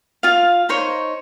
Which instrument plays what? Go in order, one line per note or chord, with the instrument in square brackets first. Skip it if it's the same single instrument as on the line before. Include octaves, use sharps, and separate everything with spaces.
[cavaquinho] F4 F5
D#4 C5 C#5